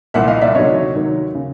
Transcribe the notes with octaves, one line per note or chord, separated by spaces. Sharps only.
C2 A#2 F3 E5 F#5
D#5 F5
D5 E5
D2 C3 D#3 F#3 C#5 D#5
D#2 D#3 F#3
C#3